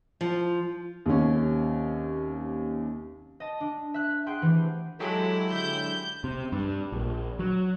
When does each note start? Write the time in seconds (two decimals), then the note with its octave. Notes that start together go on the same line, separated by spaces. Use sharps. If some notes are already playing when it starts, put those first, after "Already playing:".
0.21 F3
1.06 D#2 C3 C#4
3.40 D#5 A5
3.60 D4
3.94 E5 F#6
4.26 G#4 E5 F#5 G5 C6 F#6
4.42 E3 A3 C4 G4
5.00 F#3 G#3 E4 G4 A4
5.52 D3 G6
6.24 C3
6.52 G2
6.92 A#1
7.39 F#3